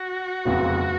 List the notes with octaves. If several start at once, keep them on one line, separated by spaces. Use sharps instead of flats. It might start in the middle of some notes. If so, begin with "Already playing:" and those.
Already playing: F#4
F1 F2 C#3 F#3 B3